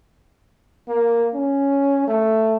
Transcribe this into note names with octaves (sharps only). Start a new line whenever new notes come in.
A#3
C#4
A3